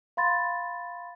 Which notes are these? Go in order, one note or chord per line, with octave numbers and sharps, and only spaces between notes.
F5 B5 C6 A6